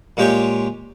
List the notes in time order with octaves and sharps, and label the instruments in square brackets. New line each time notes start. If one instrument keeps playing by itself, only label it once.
[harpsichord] A#2 G#3 G4 C#5 G5